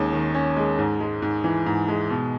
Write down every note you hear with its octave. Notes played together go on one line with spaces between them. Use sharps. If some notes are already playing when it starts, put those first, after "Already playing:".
Already playing: D#2 G#3 C#4
D#3
C#4
G#3
G#2
G#3
G#2
E3
G#2
G#3
B2